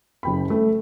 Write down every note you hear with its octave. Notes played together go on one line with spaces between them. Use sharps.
F#1 G5 B5
A3